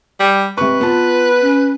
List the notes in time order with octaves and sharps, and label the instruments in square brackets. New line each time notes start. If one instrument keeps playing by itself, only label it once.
[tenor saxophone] G3
[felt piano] C3 C#6 [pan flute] G#3 [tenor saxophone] B4
[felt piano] B3 A5 [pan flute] F4
[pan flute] C#4